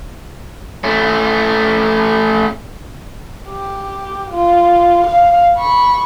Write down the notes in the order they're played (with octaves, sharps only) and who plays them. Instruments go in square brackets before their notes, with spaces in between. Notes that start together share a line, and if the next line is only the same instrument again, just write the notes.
[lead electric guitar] A3 C#4
[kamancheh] G4
F4
F5
B5 C#6